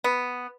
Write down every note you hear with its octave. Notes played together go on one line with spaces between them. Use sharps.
B3